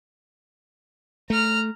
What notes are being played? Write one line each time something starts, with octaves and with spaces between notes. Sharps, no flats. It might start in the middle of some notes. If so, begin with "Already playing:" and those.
A3 A#5 F6